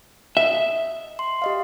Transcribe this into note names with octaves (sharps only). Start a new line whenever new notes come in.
D#5 E5
C6
G4 D#5 F5